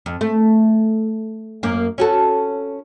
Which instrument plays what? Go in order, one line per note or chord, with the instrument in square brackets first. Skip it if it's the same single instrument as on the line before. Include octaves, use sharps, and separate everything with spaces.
[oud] F2
A3
F#2 A#3
C#4 F#4 A4